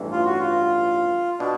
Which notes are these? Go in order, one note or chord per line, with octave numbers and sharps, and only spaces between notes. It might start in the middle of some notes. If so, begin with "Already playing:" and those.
Already playing: A1 G2 E3
F4
F#4
F4
B2 D4